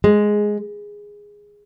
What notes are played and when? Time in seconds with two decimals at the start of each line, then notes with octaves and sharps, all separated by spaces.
0.04 G#3